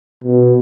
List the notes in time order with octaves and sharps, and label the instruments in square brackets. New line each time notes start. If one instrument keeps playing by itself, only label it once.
[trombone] B2